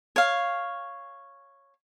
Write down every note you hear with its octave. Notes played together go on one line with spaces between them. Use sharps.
C#5 F5